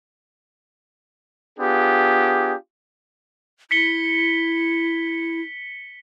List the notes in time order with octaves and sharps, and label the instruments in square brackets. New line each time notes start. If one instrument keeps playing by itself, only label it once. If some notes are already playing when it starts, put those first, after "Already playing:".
[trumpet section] B3 D4 F4 G4 G#4
[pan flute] E4 [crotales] B6 C#7 G7